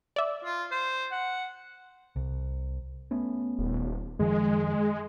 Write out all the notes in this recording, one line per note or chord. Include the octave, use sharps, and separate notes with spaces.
D5 E5
F4
C5
F#5
C2
A3 B3 C#4
D#1
F#2 D#3 F3 G#3